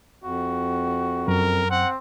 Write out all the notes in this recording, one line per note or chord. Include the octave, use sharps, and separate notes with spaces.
F2 F#4
F#2 A#4
C4 F#5